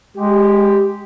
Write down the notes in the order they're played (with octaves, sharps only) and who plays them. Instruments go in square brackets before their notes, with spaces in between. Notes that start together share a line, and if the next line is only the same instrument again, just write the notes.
[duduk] G#3 [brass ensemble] G4